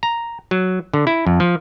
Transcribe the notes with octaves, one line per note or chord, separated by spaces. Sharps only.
A#5
F#3
D3
E4
F2
F3